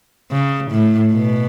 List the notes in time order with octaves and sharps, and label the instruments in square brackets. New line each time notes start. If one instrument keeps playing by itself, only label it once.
[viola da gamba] C#3
A2
B2